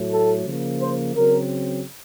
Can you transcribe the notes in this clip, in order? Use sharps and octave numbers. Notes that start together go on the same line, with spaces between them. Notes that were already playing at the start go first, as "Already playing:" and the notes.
Already playing: A2 F#3 A3
A4
C#3 F3 A#3
C5
C#3 F#3 C4 A#4